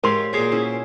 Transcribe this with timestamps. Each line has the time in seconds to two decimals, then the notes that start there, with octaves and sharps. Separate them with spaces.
0.04 G#2 G4 A#4 C#5 F5 C6
0.33 A#2 F#4 G#4 C5 C#5 D6
0.52 C#4 E4